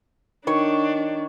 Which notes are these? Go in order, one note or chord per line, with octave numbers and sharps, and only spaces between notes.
D#3 D4 C#5 C#6